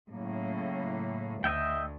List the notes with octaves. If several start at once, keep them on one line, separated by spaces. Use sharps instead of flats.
A2 C#3 F#3 A#3
D2 D#5 E5 G5